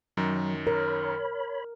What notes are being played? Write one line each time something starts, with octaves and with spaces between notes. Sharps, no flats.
F#2 D#3 F#3
A#4 C#5 B5